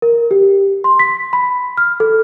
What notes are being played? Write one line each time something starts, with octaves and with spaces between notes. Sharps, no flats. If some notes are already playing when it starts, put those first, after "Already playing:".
A#4
G4
C6
B6
B5
F6
A4